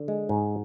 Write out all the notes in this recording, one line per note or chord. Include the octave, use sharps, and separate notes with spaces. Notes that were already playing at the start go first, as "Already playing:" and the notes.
Already playing: D3
G#3
G#2